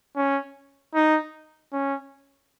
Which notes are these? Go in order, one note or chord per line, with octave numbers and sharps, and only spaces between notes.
C#4
D#4
C#4